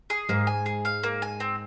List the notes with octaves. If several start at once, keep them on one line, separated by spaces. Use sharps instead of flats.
G#4
G#2 G#3 A#3
G#5
G#4
F5
A#3
G#5
C4